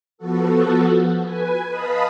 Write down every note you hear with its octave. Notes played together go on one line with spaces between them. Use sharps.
F3 B3 F#4 A4
B4 G#5
B4 D#5 F5 A5 B5 D#6